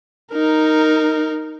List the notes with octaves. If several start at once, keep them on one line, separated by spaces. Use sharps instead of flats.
D#4 A#4